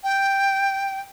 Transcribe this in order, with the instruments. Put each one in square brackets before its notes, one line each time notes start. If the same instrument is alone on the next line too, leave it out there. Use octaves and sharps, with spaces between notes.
[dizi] G5